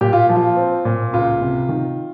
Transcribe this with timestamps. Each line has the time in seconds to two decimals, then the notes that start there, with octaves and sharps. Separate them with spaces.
0.01 A#2 G4
0.13 F4
0.29 F3
0.36 F4
0.57 C4
0.85 A#2
1.13 C#2 F4
1.41 C3
1.69 D#3